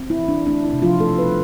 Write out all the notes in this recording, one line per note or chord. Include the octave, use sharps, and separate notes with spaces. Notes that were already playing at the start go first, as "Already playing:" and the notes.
Already playing: C4
E4
E3
D4
A3 D4
E4
C3
F3 F4
B2 A3 A4
B3 B4
G3